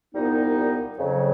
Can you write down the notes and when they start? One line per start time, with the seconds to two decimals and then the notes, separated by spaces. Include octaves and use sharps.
0.15 C2 A#2 G3 B3 D#4
0.98 F2 C#3 F#3